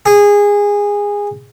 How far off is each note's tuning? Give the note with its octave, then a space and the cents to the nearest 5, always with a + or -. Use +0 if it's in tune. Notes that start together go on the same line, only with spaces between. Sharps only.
G#4 -20